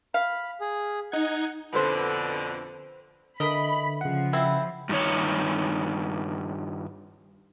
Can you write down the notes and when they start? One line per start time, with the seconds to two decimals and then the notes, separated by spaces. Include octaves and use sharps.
0.14 F5 B5
0.60 G#4
1.12 D#4 F#5 G#6
1.73 F2 B2 D3 B4 C5
3.40 D3 E3 A#4 D#5 B5
4.01 C#3 F3 F#5
4.33 B2 C4 E4
4.89 G2 D#3 C#5